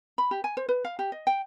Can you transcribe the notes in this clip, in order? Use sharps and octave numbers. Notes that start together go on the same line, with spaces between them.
B5
G4
G#5
C5
B4
F5
G4
D#5
G5